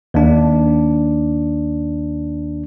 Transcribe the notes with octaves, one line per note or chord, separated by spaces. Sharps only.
D#2 D4